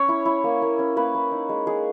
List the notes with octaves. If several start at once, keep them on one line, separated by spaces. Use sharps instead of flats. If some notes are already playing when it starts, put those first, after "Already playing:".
Already playing: C#4 C#5
E4
E4
A#3
A#3
C#4
A#3 B4
A#3
D#4
G#3
G#3 G#4